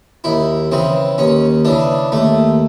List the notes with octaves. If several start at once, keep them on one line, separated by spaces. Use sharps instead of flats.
D#2 E4
C#3 E3 C4
D#2 C#4
C#3 E3 D4
D#2 A3